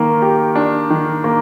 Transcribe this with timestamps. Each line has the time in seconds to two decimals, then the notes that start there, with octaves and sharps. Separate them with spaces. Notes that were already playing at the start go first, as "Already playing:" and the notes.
Already playing: D#3 A#3
0.22 G4
0.56 D4
0.90 D#3
1.24 A#3